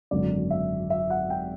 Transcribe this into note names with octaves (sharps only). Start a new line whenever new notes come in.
G#1 F#2 D3 D5
E5
E5
F#5
G5